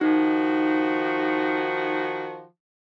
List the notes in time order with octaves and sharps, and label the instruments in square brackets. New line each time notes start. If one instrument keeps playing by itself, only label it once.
[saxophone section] D#3 F3 F#4 [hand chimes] D#4